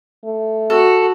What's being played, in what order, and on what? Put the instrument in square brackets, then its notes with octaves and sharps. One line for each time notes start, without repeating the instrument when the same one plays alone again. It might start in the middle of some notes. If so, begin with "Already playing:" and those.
[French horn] A3
[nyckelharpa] F#4 [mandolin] A4